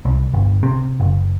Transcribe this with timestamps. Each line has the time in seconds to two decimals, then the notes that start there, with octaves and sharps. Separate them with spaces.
0.05 C2
0.34 G1
0.63 C3
1.00 F#1